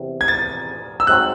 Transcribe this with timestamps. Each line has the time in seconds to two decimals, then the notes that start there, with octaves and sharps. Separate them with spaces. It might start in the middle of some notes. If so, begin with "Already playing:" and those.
Already playing: E2 C3
0.21 G#6
0.28 A6
1.00 E6
1.07 G#2 F#3 C4 F#6